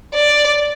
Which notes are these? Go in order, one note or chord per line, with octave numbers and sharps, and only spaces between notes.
D5